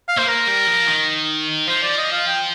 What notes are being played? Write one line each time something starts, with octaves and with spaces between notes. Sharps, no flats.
F5
A#3 C5
A#4
G3
F3
D#3
F3 C5
D5
D#5
F5
G5